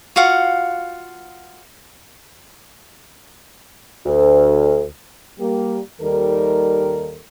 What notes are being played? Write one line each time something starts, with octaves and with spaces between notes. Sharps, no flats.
F4 F#4 F5 F#5
D2
G3 A#3 G4
D#2 D#3 G3 A4 A#4